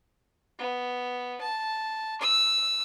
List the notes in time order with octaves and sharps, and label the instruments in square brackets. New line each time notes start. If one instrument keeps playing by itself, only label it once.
[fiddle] B3
A5
E6